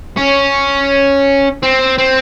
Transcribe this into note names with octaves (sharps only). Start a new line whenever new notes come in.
C#4
C4
C4